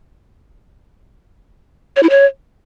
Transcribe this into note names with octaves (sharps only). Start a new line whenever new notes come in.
C#5
E4
C#5